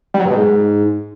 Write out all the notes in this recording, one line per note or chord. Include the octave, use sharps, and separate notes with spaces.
G3
F#3
G2
B2
G#2